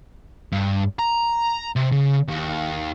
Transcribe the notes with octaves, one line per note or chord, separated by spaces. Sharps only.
G2
A#5
C3
C#3
D#2